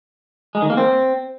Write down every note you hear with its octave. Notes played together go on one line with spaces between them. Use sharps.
G#3
D#3
A#3
C4